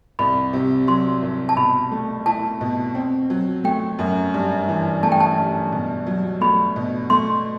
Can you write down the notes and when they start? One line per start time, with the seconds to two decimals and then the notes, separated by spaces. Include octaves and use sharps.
0.19 C2 B5
0.53 C3
0.87 F#3 C6
1.22 C2
1.49 A5
1.56 B2 B5
1.92 A3
2.26 E4 A5
2.61 B2
2.95 C4
3.30 F#3
3.64 A3 G5
3.99 F#2
4.34 G2
4.68 E3
5.03 A3 A5
5.12 G5
5.20 A5
5.38 G2
5.72 B2
6.07 F#3
6.41 A3 B5
6.76 B2
7.10 A3 C6